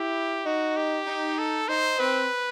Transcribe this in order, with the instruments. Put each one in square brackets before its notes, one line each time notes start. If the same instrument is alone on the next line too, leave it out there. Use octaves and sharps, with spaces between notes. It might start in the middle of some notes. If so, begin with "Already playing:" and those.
Already playing: [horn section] E4 [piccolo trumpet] G4
[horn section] D#4 [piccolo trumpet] F#4
[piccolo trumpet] G4
[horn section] D#4
[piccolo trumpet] A4
[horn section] D#4 [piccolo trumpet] C5
[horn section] C4 [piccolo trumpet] B4